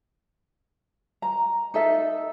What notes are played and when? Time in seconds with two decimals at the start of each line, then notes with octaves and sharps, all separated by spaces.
1.22 A#5
1.74 D#4 A4 E5